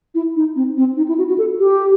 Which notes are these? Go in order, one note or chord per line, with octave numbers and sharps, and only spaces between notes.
E4
D#4
C4
C4
D#4
E4
F#4
F#4
A4
G4